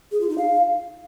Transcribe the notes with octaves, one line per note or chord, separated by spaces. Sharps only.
G#4
F4
D#4
F5